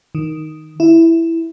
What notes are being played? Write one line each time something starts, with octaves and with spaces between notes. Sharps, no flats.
D#3
E4